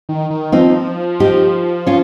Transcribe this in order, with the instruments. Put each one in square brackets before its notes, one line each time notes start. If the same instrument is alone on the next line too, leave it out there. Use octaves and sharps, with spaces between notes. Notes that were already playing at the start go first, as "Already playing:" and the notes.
[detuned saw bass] D#3
D#3
[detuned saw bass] F3 [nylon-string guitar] C4 D#4
[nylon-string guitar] D#4 G4
C#4 F4